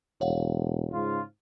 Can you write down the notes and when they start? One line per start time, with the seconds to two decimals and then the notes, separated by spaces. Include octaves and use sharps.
0.21 E1 C#5 F5 F#5
0.91 G#2 C#3 F4